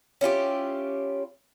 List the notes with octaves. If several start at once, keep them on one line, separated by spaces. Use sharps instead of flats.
C#4 E4 F4 G4